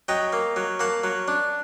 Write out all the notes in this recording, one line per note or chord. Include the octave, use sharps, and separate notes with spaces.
F#3 D#5 G5
A#3
F#3
A#3 F#5 A5
F#3
D4